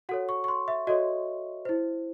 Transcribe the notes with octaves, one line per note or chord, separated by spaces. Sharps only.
F#4 A4 C#5 F#5
C#6
C#6
C6
E5
F#4 A4 C#5 D#5
E4 C5